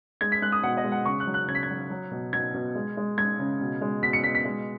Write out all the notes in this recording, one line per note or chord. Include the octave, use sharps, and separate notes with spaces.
G#3 G#6
B6
G#3 F#6
D#6
B2 F#5
D#5
G#3
F#5
C#3 C#6
F#6
F#3
F#6
C#3 G#6
B6
G#6
F#3
F#3
B2
B2 G#6
B2
G#3
G#3
G#3 G#6
C#3
B2
G#3
B2 B6
C#7
B2 B6
B6
G#3